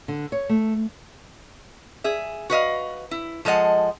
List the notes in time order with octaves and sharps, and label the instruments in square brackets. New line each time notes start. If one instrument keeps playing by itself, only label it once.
[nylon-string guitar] D3
C#5
A3
[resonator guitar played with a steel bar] G#4 E5
F#4 B4 D#5 F5
E4
F3 G#3 A4 D#5 F#5